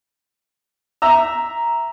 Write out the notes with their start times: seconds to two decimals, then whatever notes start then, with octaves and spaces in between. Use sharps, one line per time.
1.02 E5 A#5 E6